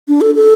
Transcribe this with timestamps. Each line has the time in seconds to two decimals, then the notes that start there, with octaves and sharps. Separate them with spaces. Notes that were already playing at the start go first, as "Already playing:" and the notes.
0.08 D4
0.21 A4
0.35 A4